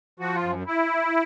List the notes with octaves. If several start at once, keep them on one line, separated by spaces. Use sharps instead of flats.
F3 F#4
F4
F#2
E4